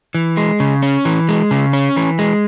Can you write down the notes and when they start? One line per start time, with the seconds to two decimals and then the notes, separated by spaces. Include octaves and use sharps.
0.15 E3
0.37 G#3
0.60 C#3
0.82 C#4
1.05 E3
1.29 G#3
1.51 C#3
1.73 C#4
1.96 E3
2.19 G#3